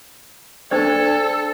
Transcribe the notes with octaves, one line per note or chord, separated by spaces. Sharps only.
D4 A4 C5 D5